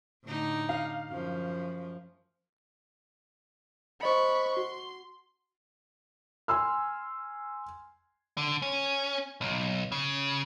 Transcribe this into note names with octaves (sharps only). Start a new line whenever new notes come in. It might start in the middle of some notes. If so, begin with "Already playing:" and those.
A2 D3 D#4
F5
F#2 F3
C5 D#5 B5 C#6 C#7
F#4 C6
G#5 C6 E6 F6
D3
C#4
B1
C#3